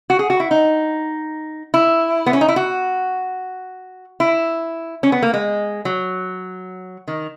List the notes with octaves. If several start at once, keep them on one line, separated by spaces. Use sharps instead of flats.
F#4
G#4
F#4
E4
D#4
E4
B3
C#4
D#4
E4
F#4
E4
C#4
B3
A#3
G#3
F#3
D#3